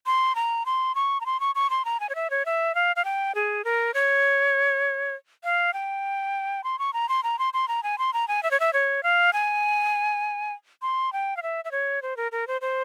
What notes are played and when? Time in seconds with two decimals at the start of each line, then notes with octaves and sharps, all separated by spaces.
0.06 C6
0.35 A#5
0.66 C6
0.95 C#6
1.21 A#5
1.26 C6
1.40 C#6
1.55 C#6
1.70 C6
1.85 A#5
2.00 G#5
2.09 C#5
2.15 E5
2.30 C#5
2.46 E5
2.75 F5
2.96 F5
3.05 G5
3.35 G#4
3.65 A#4
3.94 C#5
5.44 F5
5.74 G5
6.64 C6
6.79 C#6
6.93 A#5
7.09 C6
7.23 A#5
7.39 C6
7.54 C6
7.68 A#5
7.83 G#5
7.98 C6
8.13 A#5
8.28 G#5
8.43 E5
8.51 C#5
8.60 E5
8.73 C#5
9.03 F5
9.33 G#5
10.82 C6
11.13 G5
11.37 F5
11.43 E5
11.65 E5
11.72 C#5
12.02 C5
12.17 A#4
12.32 A#4
12.47 C5
12.61 C5